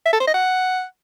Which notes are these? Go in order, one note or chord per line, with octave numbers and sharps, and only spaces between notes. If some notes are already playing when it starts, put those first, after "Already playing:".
E5
A4
C5
D#5
F#5